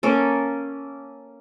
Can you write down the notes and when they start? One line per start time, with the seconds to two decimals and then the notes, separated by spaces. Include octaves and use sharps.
0.03 A#3 C#4 A4